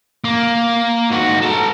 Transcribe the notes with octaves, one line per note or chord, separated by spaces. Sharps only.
A#3
G#2 F#4
A4 A#5